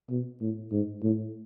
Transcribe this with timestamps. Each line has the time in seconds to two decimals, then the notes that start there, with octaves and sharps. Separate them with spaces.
0.10 B2
0.41 A2
0.72 G#2
1.03 A2